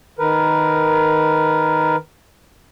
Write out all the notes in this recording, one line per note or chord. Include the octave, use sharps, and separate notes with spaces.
D#3 A#4 B4